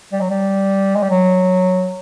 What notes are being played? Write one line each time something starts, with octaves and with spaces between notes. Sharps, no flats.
G3
F#3
G3
G#3
G3
F#3